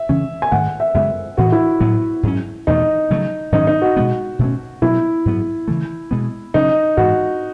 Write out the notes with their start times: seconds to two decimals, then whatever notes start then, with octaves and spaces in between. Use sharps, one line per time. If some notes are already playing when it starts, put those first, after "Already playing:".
Already playing: E5
0.09 C#3 E3 G#3 C#4
0.42 G#5
0.52 G#2 D#3 A3 F#5
0.80 E5
0.94 F#2 C#3 G#3 B3 E5
1.38 A2 E3 B3 F#4
1.52 E4
1.80 A2 F#3 B3
2.23 G#2 F#3 C#4
2.67 E2 B2 A3 D#4
3.10 C#3 F#3 A3
3.52 G#2 D#3 F#3 C#4 D#4
3.67 D#4
3.82 F#4
3.97 B2 G#3 B3
4.39 B2 A3 C#4
4.82 B2 F#3 B3 E4
5.25 G#2 F#3 B3
5.68 C#3 E3 A3
6.11 B2 G#3 B3
6.54 C#3 F#3 C#4 D#4
6.97 G#2 E3 G#3 F#4